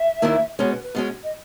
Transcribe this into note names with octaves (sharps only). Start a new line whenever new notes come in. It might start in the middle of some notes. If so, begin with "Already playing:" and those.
Already playing: E5
D#2 D#3 A#3 E4
B2 G#3 C#4 C#5
B4
B4
B2 G#3 C#4
D#5